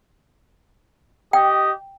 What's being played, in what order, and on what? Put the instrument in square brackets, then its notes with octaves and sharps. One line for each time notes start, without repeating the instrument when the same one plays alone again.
[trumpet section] G4 D#5 [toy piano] G5